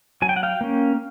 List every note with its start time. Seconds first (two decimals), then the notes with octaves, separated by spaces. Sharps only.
0.22 F#3 G#5
0.29 G5
0.36 F#5
0.43 F5 G5
0.61 A#3 C#4